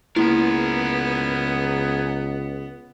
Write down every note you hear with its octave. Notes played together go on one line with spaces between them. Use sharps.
C#2 A#3 B3 E4 G#4 A#4